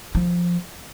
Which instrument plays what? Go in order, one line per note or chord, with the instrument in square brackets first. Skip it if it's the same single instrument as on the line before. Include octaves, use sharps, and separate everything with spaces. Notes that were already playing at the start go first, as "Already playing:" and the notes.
[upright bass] F3